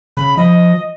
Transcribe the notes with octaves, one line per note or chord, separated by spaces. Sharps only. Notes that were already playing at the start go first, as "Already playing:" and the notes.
C#3 B5
F3 D#5